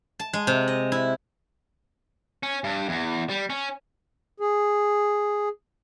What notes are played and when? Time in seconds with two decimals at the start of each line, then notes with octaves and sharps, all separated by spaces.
0.19 A5
0.33 G#3
0.47 C3
0.68 D#5
0.92 E4
2.43 C#4
2.64 G2
2.89 E2
3.30 G3
3.50 C#4
4.40 G#4